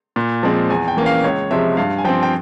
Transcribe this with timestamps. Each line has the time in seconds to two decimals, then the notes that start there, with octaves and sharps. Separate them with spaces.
0.16 A#2
0.43 F3 G#3 C4
0.70 E2 G#5
0.88 G5
0.97 E3 A#3 C#4
1.06 F5
1.24 C#2 C#5
1.51 C3 F3 G#3 E5
1.77 G2 F5
1.98 G#5
2.04 F3 C4 G5
2.23 G5